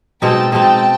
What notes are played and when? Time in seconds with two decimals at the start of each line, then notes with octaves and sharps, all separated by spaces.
0.22 B2 G#3 C4 D#4 G5 A5
0.52 B2 G#3 C4 D#4 G5 A5